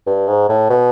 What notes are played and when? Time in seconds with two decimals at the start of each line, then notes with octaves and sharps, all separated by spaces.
0.06 G2
0.28 G#2
0.49 A2
0.70 B2